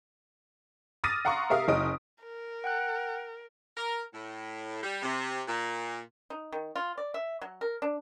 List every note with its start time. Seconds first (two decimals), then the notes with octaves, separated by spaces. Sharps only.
1.04 D6 D#6 F6 A6 A#6 D#7
1.25 F5 F#5 A#5 C6 C#6
1.50 C3 A#4 E5 F5 D#6 F6
1.68 F#1 C#4 D#4 D#6 D7
2.23 A#4
2.64 F#5 G5 F#6
3.76 A#4
4.14 A2
4.83 G3
5.03 C3
5.48 A#2
6.30 D#4
6.52 D#3
6.76 F4
6.98 D5
7.14 E5
7.41 F#3
7.61 A#4
7.82 D4